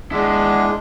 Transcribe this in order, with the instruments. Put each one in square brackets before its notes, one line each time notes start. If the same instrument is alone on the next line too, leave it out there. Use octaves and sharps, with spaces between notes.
[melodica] G#3 D4 [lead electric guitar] E4 G#4